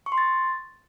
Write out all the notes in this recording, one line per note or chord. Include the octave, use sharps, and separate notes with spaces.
C#6
C6
A6